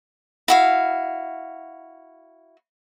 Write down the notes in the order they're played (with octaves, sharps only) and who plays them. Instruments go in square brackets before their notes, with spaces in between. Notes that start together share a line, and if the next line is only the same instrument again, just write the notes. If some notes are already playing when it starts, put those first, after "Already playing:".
[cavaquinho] E4 F#4 F5